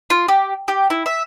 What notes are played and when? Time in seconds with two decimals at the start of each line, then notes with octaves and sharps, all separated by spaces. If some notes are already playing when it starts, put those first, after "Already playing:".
0.10 F4
0.28 G4
0.68 G4
0.90 E4
1.06 E5